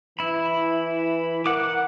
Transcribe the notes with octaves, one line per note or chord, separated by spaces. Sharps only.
E3 E4 B5
A#4 F#5 D6